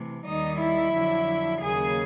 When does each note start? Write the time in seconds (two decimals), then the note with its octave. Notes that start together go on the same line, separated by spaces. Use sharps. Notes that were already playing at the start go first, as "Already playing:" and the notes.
Already playing: C3 E3 A3
0.25 D#2 D#3 G3 D#4 D#5
0.60 E4 E5
0.94 F2 D3 F#3
1.63 D#2 C#3 F#3 A#3 G#4 G#5